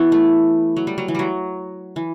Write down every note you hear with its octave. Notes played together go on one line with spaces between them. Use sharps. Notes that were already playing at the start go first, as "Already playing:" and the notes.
Already playing: E3 B3 E4 F#4
A3
F#3
G3
F#3
E3
F#3 G3
E3